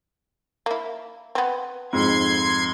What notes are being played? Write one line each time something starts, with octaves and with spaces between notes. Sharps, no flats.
A#3 E4
B3 C4
F2 G#2 C6 G#6